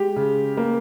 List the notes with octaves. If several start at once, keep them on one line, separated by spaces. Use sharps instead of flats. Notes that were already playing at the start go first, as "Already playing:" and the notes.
Already playing: G#3 G4
C#3
A#3